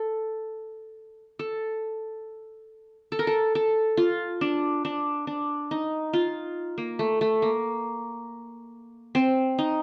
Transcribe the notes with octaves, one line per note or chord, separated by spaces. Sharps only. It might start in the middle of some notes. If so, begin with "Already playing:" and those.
Already playing: A4
A4
A4
A#4
A4
A4
F4
D4
D4
D4
D#4
F4
A#3
A3
A3
A#3
C4
D#4